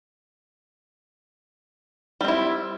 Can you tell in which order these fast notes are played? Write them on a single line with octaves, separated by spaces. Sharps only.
G3 C4 E4